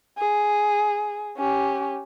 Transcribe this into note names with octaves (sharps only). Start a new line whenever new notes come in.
G#4
C#4 G4